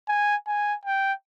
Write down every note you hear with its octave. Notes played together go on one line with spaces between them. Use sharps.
G#5
G#5
G5